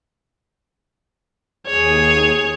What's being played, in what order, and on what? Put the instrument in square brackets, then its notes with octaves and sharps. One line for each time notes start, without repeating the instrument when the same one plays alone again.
[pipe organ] D#2 G#4 [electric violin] C#5